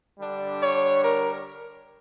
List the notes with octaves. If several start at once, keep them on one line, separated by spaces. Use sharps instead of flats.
D3 G3 D4
C#5
A#4